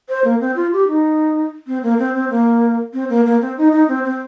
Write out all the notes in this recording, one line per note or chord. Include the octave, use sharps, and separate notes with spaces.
C5
A#3
C4
F4
G4
D#4
C4
A#3
C4
C4
A#3
C4
A#3
A#3
C4
D#4
D#4
C4
C4